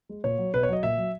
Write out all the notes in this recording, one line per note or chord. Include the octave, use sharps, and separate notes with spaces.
G#3
A#2 C#5
F#3
B2 B4
C#5
F#3 D#5
A#2 E5
F#3